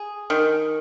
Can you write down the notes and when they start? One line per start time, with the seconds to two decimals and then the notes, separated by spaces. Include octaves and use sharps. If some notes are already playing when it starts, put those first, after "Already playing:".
Already playing: G#4
0.30 D#3